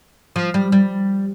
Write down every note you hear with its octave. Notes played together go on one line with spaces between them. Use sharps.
F3
G3
G3